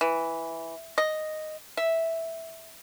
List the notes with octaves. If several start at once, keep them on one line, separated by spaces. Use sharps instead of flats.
E3
D#5
E5